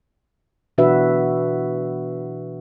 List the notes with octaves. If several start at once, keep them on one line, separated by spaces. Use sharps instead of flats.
B2 E3 D4 F#4 B4 E5